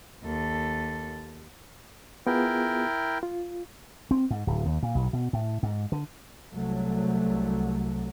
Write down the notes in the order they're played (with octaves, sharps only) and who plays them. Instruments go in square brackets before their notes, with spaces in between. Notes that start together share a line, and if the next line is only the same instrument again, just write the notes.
[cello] D#2 A4
[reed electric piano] B3 F4 G#4 [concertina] E4 A#4 G5
[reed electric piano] F4
[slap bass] C4
G#2
D1
D#2
A#2
B1
B2
A2
G#2
D3
[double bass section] C2 F#3 A3